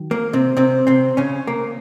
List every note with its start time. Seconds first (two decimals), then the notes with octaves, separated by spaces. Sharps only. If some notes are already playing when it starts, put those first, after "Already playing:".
Already playing: D#3 F#3
0.11 A#3
0.33 C3 C4
0.57 C3 C4
0.87 C3 C4
1.17 C#3 C#4
1.47 A#3